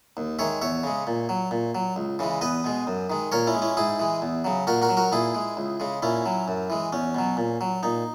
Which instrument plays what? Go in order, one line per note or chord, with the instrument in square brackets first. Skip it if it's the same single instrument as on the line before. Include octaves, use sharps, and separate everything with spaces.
[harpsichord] D#2
D#3 G#3 C#5 E5
E2 C#5 E5
C#3 G#3
A#2
F#3
A#2
F#3
C#2
C#3 E3 G#3
E2 B4 D#5
B2 G#3
F#2
D#3 G#3
A#2 A#4 C#5
C#4 E4
G#3
C#4 E4
G#2 E4 G#4
E3 G#3
E2
C#3 F#3
A#2 F#4 A#4
F#4 A#4
F#3
F#4 A#4
A#2 E4 G#4
G#3
C#2
C#3 G#3
A#2 C#4 E4
F#3
F#2
E3 G#3
E2 C#4
B2 F#3
A#2
F#3
A#2 D#4